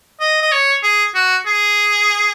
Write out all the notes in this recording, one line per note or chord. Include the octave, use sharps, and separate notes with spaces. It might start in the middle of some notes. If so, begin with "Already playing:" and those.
D#5
D#5
C#5
G#4
F#4
G#4